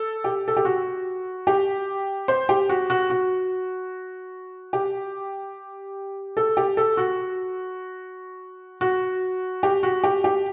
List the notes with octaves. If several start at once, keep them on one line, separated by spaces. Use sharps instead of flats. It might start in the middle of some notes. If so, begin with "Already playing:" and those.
Already playing: A4
G4
A4
G4
F#4
G4
C5
G4
F#4
F#4
F#4
G4
A4
G4
A4
F#4
F#4
G4
F#4
G4
G4